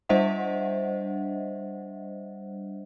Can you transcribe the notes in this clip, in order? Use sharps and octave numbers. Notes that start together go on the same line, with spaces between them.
G3 D4 C5 D#5 E5 F#5